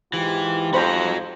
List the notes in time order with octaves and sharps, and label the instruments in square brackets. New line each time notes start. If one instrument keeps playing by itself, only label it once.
[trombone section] G#2 F4 G4 [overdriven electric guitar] E3
[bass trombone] F2 [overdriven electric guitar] F#4 A#5 [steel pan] C5 B5